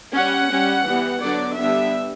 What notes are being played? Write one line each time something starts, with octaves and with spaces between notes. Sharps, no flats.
G3 C#4 F#5
G3 C#4
E3 G3 B3
D3 F#3 B3 D4 D5
D3 G3 B3 D4 E5